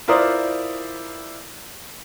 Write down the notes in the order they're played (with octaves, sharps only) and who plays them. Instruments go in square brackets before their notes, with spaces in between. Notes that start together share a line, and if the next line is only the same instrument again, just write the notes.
[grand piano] E4 F4 A#4 C5 D5 D#6